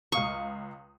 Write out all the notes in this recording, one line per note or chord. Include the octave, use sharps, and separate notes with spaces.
C#2 F5 C#6 D#6